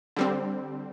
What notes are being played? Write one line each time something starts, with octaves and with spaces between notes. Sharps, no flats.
D3 G3 C4